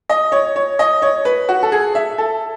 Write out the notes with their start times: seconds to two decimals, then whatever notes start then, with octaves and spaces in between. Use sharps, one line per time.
0.09 D#5
0.32 C#5
0.56 C#5
0.79 D#5
1.02 C#5
1.25 B4
1.49 F#4
1.63 A4
1.72 G#4
1.95 E5
2.18 A4